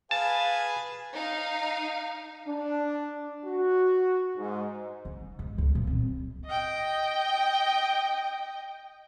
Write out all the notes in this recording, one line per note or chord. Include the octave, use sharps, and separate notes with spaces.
G#4 B4 F5 A5
D#4 F5
D4
F#4
G#2
C#3
G#2
C#2
A#2
C4
D#5 G5